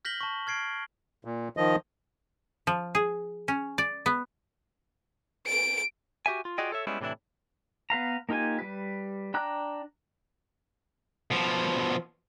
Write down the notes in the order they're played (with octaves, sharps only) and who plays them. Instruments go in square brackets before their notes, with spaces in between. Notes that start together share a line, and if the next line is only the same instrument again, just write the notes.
[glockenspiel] F6 G6 A#6 B6 F#7 G7
A5 C#6
F6 G#6 C7 D7
[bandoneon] A#2
D#3 F3 D#5
[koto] F3
G#4
C#4
D5
B3
[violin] D7
[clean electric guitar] F#4 G4 E5 G#5
F4
F4 F#4 G#4 D5 D#5 G5
A4 C#5 E5
G3 G#3 B3 C#4 E4
A2 C3 E3 D4 E4
[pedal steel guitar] B3 B4 F5 A#5
A#3 D#4 F4 G4 G#5
G3 B4
D4 G5 A#5 D6 F#6
[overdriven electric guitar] B2 F3